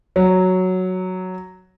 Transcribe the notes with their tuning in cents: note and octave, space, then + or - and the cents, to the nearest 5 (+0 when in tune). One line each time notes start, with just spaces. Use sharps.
F#3 +0